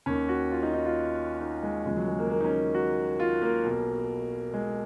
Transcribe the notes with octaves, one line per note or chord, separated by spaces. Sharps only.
D#2 D#3 C#4
F#4
F4
D#4
D#4
F4
D#4
G#3
D#2 C#3 F3 G#3
F#3
G#3
A#3
A#3
D#4
C#4
F#4
F4
A#3
B1 B2
G#3